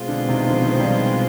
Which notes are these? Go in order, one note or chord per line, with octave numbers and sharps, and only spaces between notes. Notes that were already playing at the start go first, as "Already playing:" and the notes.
Already playing: B2 G#3 C4 F4
D3
C3 D#3
D3 F3
D#3
F3
D#3 G3